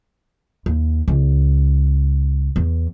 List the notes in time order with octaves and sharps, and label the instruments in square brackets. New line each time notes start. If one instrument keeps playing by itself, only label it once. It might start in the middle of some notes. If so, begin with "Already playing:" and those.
[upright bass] D#2
C#2
E2